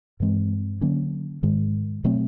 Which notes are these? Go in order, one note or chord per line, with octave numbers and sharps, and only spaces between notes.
G2 E3 G#3 C4
D3 F#3 A#3 C#4
G#2 D#3 G#3
B2 F#3 A3 C4